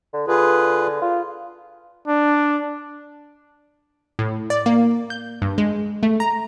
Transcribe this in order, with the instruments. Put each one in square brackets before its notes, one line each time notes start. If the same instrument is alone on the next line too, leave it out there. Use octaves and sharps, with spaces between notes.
[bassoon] D3
[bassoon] D3 [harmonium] F4 G#4 B4
[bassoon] F4
[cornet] D4
[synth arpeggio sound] A2
D5
A#3
G6
G2
G#3
A3
A#5